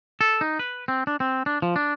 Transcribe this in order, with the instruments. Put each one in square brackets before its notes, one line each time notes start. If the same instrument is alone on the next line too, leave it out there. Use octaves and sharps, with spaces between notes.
[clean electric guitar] A4
D#4
B4
C4
D4
C4
D4
F3
D4